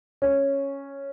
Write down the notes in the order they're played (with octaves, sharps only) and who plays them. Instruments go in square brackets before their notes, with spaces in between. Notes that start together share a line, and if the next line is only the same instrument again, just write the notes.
[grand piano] C#4